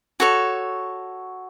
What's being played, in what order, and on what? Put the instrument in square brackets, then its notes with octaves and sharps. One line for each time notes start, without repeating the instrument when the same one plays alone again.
[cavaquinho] F#4 A4 C#5